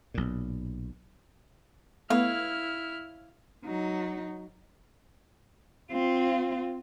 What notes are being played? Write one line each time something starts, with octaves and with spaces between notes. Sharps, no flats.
B1 A#2
A3 B3 E4 C#5 F5 F6
F#3 D#4
C4 F4